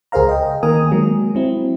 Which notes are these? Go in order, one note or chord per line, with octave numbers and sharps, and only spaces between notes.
C#2 G#4 A#4 C5 F5 A#5
D#5 G5
D#3 A#3 A#4 G#5 D#6
F#3 G#3 A#3
F#3 C4 E4